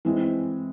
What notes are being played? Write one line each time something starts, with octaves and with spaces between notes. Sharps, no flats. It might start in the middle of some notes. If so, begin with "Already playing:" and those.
E3 G#3 C4